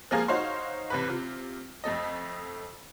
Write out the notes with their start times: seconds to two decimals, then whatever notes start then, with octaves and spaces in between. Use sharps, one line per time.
0.11 F3 G#3 A#3 G#4 A#4 F5
0.28 D#4 F#4 C5 C#5 F5 C6
0.90 A1 C3 B4
1.08 C3 F4
1.84 F2 A3 A4 D#5